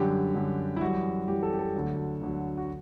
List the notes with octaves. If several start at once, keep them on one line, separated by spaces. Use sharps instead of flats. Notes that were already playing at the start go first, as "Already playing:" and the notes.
Already playing: F#2 D3 G3 G4
F#2 D3 G3
E4
F#2 E3 G3 F#4
F#2 E3 G3 G4
A4
G4
A4
D2 D3 F#3
D2 D3 F#3
F#4